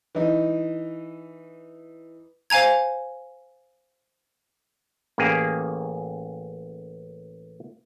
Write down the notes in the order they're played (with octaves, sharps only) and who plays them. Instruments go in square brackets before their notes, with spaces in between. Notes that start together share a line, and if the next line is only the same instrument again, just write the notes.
[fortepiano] E3 D#4
[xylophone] C5 F5 G#5 A#5 G#6
[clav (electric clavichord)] A1 A#3 C#4 G4 G#4